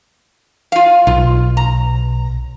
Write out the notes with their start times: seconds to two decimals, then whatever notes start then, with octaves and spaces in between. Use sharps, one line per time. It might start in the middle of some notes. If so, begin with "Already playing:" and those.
0.72 F4 F5
1.07 B1 F4
1.57 A#5